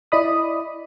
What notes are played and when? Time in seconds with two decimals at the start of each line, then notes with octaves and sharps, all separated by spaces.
0.12 E4 D5 D#5 B5 D#6